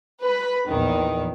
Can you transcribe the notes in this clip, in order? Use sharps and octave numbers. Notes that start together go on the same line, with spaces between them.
B4 B5
A#1 E2 D#3